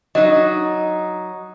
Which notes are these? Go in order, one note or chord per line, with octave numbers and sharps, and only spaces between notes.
F#3 D#4 D#5